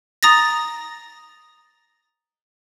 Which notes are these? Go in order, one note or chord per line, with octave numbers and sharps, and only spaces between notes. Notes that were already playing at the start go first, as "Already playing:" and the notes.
A#5 D#6 A6 A#6